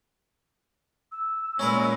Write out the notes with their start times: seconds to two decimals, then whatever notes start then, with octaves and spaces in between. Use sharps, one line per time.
1.12 E6
1.59 A#2 G#3 C#4 A#4 B4